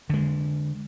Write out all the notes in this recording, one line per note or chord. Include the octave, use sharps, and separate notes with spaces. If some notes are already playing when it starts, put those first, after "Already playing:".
D3 G#3